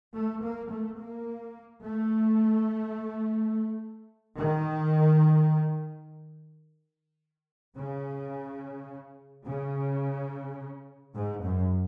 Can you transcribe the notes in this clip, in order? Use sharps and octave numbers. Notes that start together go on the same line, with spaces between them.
A3
A#3
A3
A#3
A3
D#3
C#3
C#3
G#2
F#2